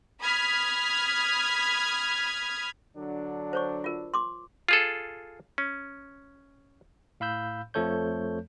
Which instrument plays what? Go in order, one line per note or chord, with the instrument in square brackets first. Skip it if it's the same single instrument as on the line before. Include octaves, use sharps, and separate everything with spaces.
[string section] B5 D#6 F6 G#6 B6
[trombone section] D3 F#3 D4
[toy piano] C5 C#5 C#6
F4 A#4
C6 D6
[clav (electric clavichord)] F4 G#4 A4
C#4
[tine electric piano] A2 F5 B5 E6 G6
F2 F3 A3 A4 C#5 G6